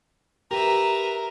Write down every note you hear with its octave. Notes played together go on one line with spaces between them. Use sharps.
G4 A#4 B4 E5 A#5